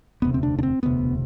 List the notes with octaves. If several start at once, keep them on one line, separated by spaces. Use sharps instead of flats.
E1 D2 C3 B3
C4
D4
D4
C4
E1 D2 C3 B3